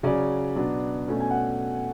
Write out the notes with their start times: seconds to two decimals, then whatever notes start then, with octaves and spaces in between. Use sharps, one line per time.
0.03 C#3 F#3 C#4 D5
0.55 B2 F#3 B3 D4
1.08 B2 A3 C#4
1.20 G#5
1.31 F#5